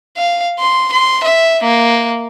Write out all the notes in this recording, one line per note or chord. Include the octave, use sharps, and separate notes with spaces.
F5
C6
C6
E5
A#3